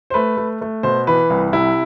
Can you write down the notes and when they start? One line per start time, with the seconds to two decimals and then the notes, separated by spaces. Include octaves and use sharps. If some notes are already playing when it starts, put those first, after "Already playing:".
0.10 C5
0.14 A3 B4
0.37 A3
0.61 A3
0.83 B2 C5
1.07 E3 B4
1.30 C2
1.53 C3 E4